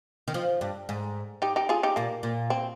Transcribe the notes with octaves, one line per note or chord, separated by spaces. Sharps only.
D#3
F3
G2
G#2
D#4 G4
D#4 G4
F4 G#4
D#4 G4
A#2 A#3
A#2
C4